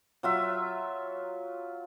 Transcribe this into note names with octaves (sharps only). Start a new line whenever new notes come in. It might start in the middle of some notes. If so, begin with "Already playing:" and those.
F#3 F4 E5